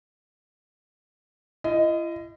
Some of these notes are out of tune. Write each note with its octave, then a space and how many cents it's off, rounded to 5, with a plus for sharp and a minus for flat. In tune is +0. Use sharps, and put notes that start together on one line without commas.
E4 +45 D#5 +0